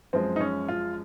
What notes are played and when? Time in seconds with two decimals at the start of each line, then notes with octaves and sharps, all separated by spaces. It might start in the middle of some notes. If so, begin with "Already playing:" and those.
0.13 F#2 F3 G#3 C4
0.36 D#4
0.41 C#4
0.68 F4